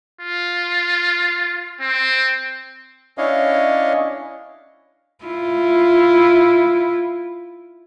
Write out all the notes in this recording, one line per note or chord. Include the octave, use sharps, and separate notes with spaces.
F4
C4
C#4 D4 E4 C#5 D#5 F5
E4 F4